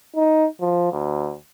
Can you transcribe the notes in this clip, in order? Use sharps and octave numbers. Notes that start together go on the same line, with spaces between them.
D#4
F3
D2